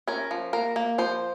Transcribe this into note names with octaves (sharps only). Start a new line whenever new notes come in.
C#4 A#4
F3
A#3 A#4
A#3
F3 C5